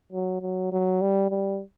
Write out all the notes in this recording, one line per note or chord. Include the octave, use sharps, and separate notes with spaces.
F#3
F#3
F#3
G3
G3